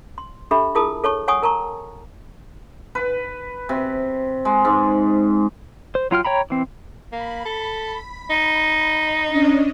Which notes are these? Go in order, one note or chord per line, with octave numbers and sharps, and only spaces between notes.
C6
D4 G4 A4 E5 B5
E4 F4 G#4 A#4 A5 D#6
A4 C#5 A5 C#6
C#5 F#5 G#5 C#6 D#6
A#4 A5 A#5 C#6
B4
C3
G#3
G#2
C5
F#3 F4 G5 F6
C#5 G5 A#5 B5
E3 C4
A#3 B5
A4
D#4
C#4 D4 D#5